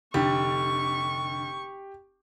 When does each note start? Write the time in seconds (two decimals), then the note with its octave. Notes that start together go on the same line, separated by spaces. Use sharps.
0.14 F1 D3 G4 C#6 A6